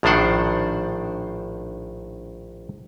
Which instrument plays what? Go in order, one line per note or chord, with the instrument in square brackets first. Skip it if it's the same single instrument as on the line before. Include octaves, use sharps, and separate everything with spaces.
[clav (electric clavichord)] A#1 A2 D#3 D4 C5 F#5